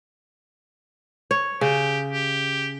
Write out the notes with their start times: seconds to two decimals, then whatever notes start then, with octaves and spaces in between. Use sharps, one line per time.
1.31 C#5
1.61 C#3 G4
2.13 G4